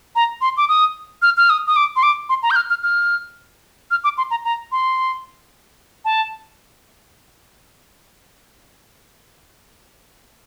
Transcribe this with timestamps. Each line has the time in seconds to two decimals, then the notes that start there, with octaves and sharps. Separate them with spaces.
0.15 A#5
0.41 C6
0.57 D6
0.68 D#6
1.22 F6
1.37 F6
1.50 D#6
1.67 D#6
1.76 D6
1.96 C6
2.03 D6
2.29 C6
2.43 A#5
2.51 G6
2.56 F6
2.70 F6
2.83 F6
3.91 F6
4.04 D6
4.18 C6
4.31 A#5
4.45 A#5
4.72 C6
6.05 A5